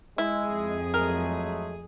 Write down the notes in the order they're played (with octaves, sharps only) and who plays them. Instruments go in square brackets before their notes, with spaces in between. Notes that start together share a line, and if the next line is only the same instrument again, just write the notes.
[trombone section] G#3 [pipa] E4
[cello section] F2 G#4
[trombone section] F#3 G#3 A3 [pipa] A#4